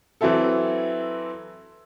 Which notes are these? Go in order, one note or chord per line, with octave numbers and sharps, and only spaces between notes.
E3 F#3 C4 E4 A4